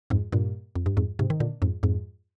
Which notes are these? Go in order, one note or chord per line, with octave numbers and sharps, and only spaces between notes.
F2 G#2
G2 A#2
F2
G2
F2 G#2
G#2 C3
D#3
A#2 D3
F2 G#2
F2 G#2